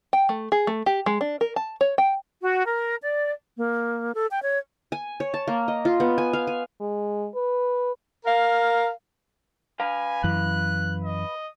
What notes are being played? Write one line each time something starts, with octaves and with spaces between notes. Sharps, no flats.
G5
A3
G#4
A3
G4
G#3
D4
A#4
A5
C#5
G5
F#4
A#4
D5
A#3
A4
G5
C#5
G#5
C#5
A5
A#3
D#5
F4
B3
G#5
F5
G#5
G#3
B4
A#4 F5
B4 F5 G#5
F#2 E3 F#6
D#5